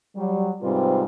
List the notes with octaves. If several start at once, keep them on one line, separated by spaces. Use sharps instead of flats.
F#3 G3
G#2 C3 G3 C4 F4 B4